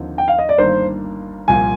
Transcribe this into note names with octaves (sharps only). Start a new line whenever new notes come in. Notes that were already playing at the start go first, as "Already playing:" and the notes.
Already playing: D#2 D3 F3 C4 D#4
G5
F5
D#5
D5
G1 G2 D#3 A#3 D4 C5
C2 A#2 F3 C4 F4 G#5